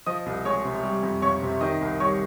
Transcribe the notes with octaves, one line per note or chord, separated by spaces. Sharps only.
F3 D#5 D#6
C2
G#3 C#5 C#6
C3
G3
F2
F2 C#5 C#6
C3
D#3 D#5 D#6
C2
G3 C#5 C#6